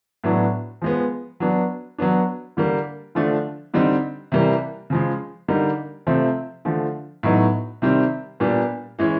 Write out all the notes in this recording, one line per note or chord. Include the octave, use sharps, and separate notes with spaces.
A2 F#3 B3 D4
F3 G#3 B3
F#3 B3 D4
F#3 B3 D4
D3 G3 A#3
D3 F3 A3 D4
D3 G3 C4 D#4
C3 E3 G3 A#3
C#3 F3 G#3
D3 G3 A#3 D#4
C3 F3 A3 C4
D3 F3 A3
A2 F#3 B3 D#4
C3 D#3 G3 C4
A#2 G3 B3 D4
E3 G#3 C#4 E4